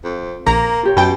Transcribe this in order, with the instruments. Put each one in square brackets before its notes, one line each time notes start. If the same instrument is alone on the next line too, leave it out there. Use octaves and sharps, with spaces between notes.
[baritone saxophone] F2
[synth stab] A#1 A#5 [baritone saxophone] A#3
[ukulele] F4 G4 C#5
[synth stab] F#2 G5 [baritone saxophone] B2